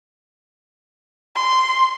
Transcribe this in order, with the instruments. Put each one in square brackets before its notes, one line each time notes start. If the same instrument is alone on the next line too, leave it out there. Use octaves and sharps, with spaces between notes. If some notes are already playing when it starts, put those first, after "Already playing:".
[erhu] C6